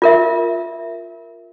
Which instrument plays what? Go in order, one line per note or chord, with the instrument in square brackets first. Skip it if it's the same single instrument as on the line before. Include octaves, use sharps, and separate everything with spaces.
[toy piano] F4 A#4 E5